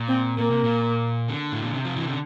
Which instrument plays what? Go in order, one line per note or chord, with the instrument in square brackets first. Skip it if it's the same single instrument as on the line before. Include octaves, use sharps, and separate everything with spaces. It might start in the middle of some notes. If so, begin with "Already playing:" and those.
Already playing: [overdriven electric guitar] A#2
[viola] C4
[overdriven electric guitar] A#2 [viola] A#3
[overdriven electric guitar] C3
A#2
D3
A2
A#2
C3
F3
E3
D3